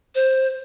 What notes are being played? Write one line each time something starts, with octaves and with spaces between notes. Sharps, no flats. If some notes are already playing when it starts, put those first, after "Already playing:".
C5